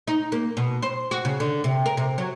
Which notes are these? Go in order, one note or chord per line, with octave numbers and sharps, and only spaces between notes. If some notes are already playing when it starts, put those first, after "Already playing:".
D#4
A#3
B2
C5
F#4
C#3
D3
C3
A#4
C3
F#3